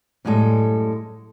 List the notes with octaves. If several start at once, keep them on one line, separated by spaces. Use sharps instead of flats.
F#2 A2 G3 G#3 A4